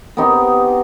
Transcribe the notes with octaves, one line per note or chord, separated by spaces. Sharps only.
B3 C4 D#4 G4